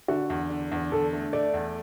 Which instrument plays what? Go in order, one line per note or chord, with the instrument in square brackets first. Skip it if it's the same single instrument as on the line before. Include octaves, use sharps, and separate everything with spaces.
[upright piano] D3 [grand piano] F#4
[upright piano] E2
D3
E2
[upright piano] D3 [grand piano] A4
[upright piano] A3
[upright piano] A3 [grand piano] D5
[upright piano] E2